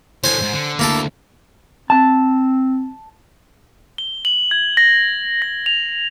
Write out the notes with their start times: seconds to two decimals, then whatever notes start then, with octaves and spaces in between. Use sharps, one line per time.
0.24 A2 D3 C5 G#5
0.42 G#2
0.54 D3
0.79 D2 A#3 E4 A4
1.90 C4 A5
3.98 G7
4.25 F#7
4.51 G#6
4.77 A#6
5.42 A#6
5.66 F7